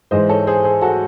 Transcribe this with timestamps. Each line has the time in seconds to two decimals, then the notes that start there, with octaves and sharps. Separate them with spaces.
0.11 G#2 E3 G#3 C5 D#5
0.29 A4 C#5
0.47 G#4 C5
0.64 G#4 C5
0.81 F#4 A4